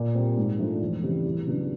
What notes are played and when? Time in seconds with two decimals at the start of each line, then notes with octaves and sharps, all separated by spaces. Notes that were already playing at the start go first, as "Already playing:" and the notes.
Already playing: A#2
0.15 G3 C4
0.37 G#2
0.59 F3 A3 D4
0.81 E2
1.03 C#3 E3 G3 C4
1.25 E2
1.47 C#3 F#3 B3 D4